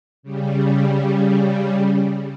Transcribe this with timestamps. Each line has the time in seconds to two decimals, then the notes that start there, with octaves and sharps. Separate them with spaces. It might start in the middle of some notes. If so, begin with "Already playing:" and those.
0.23 C#3 G3